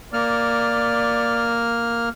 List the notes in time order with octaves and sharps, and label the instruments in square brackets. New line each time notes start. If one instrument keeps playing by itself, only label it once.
[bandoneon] A#3 F6 [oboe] D5